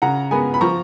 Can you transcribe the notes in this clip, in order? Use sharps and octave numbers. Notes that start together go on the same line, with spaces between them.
C#3 F#5 A#5
G#3 B3 G#5 B5
B5
F3 A#5 C#6